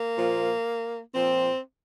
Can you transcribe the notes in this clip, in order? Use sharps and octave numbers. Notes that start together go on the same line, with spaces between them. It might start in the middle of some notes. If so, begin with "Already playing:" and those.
Already playing: A#3
A#2 F3
A#2 F3 C4